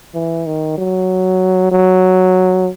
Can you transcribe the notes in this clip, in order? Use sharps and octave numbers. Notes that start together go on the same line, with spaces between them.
E3
D#3
F#3
F#3